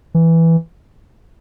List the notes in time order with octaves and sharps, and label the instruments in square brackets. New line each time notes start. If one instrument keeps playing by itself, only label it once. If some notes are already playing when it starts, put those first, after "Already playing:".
[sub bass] E3